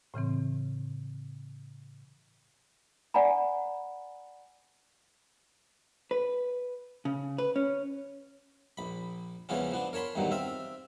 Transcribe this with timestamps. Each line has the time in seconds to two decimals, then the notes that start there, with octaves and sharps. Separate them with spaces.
0.14 A2 C#3 E3 C4
3.14 D5 F#5 G#5 A#5 B5
6.11 B4
7.05 C#3
7.38 B4
7.56 C#4
8.77 A#1 B5
9.49 E2 C#3 E3 F3 B3 C#4
9.72 F3 B3 D4
9.93 A#4 C#5 A5 B5 C6
10.15 E2 G2 A#2 D#3 F#3
10.31 C4 E5 F5